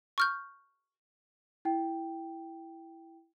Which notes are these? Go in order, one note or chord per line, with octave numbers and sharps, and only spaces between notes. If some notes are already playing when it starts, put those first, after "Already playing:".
C#6 F6 G6
E4 G5